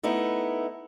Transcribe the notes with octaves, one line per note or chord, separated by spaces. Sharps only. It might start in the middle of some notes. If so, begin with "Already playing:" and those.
A3 B3 D#4 E4